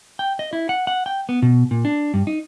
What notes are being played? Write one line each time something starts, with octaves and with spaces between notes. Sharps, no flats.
G5
D#5
E4
F#5
F#5
G5
B3
B2
A#2
D4
G2
D#4